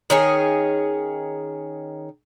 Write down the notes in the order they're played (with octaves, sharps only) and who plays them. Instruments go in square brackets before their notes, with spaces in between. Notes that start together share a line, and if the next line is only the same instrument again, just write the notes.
[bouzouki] D#3 C#4 G#4